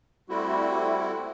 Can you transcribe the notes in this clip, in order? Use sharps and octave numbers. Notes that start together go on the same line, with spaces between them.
G3 A3 C4 E4 F#4